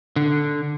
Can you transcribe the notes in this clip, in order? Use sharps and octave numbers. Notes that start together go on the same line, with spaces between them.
D3